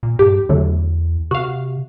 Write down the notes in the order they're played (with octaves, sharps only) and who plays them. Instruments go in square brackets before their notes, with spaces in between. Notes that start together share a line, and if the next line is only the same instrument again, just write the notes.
[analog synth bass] A#2
[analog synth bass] G2 [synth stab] G4
[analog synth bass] E2 [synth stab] D3 F#3 A3
[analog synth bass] C3 [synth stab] F#4 F5